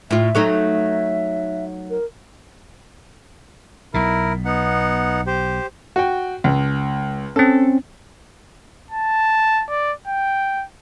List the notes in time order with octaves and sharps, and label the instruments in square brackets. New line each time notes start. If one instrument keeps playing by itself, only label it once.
[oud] A2 F4 [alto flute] E5
[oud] F#3 A3 D#4
[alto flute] A#4
[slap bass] B1 B2 [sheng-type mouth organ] E4 A#4
[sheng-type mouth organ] B3 D#4 F#5
G4 C5
[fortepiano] F#4 G5
C#2
[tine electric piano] C4 C#4 [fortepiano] A4
[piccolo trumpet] A5
D5
G5